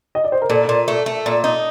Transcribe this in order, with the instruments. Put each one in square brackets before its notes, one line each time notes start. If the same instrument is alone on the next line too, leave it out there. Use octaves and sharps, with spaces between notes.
[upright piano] D#5
D5
C5
A#4
[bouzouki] A#2 [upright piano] A4
[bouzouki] A#2
A3
A3
A#2
D#4